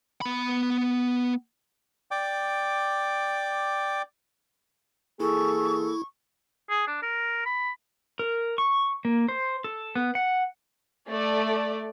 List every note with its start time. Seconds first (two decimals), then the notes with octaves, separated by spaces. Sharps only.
0.21 B3 B5
2.11 D5 G5 D6
5.20 E3 A#3 E4 G#4 A4 C#6
6.70 G#4
6.87 D4
7.02 A#4
7.45 B5
8.19 A#4
8.58 C#6
9.05 A#3
9.28 C5
9.64 A4
9.95 B3
10.15 F#5
11.09 A3 D5